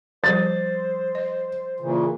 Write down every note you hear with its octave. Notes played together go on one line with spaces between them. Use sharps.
F3 G3 C5 A6
D#5
A#2 C#3 E3